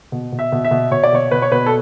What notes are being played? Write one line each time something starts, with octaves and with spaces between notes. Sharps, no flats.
B2
B2
E5
B2
E5
B2
B2 C#5
D5
B2 C#5
B2 B4
C#5
B2 B4
A4